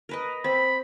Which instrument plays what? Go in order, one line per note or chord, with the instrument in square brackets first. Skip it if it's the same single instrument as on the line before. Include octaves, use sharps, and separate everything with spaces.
[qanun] A#4 B4 D#5
[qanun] C4 [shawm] B5